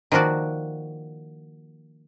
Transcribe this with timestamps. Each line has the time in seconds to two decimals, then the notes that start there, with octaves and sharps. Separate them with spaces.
0.12 D#3 F3 A#3 F#4 D5